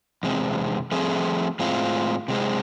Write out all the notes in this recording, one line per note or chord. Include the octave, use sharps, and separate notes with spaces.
E2 C3 G#3 C4
F3 A3 C4 G#4
A2 G#3 C4 F4
C3 G#3 C4